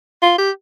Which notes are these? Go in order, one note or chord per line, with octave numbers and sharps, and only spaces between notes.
F4
G4